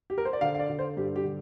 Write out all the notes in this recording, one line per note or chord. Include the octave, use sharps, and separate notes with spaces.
G4
A#4
C5
D5
D3 F5
F5
D5
D3
C5
G2 G4
G4
D3